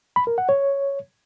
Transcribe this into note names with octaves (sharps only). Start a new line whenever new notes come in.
B5
A#4
F#5
C#5